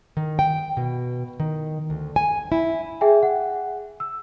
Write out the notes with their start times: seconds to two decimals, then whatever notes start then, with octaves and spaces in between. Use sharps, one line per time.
0.17 D#3
0.39 G5
0.77 B2
1.40 D#3
1.90 D2
2.16 G#5
2.52 E4
3.01 G#4 E5 G5 G#5
3.23 F#5
4.00 E6